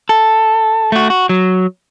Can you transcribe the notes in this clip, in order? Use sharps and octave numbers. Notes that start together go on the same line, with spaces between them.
A4
A3 F#4
F#4
F#3